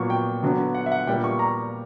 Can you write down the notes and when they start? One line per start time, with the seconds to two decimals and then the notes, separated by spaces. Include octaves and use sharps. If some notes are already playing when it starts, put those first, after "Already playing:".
Already playing: A#2 F#3 B3 C#6
0.10 G5
0.43 D3 F#3 B3
0.75 F#5
0.86 E5
0.92 F#5
1.07 A#2 G3 B3 G5
1.24 C#6
1.39 A#5